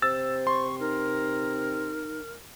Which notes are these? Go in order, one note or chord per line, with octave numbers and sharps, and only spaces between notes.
C3 C5 E6 A6
C6 C#6
D#4 A#4